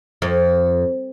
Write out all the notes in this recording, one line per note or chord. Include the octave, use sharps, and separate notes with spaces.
F2